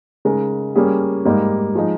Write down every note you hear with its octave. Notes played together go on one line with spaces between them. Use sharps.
C#3 G#3 D#4 A#4
G3 A#3 C#4 G#4
G#2 G3 A#3 D#4
F3 G#3 D#4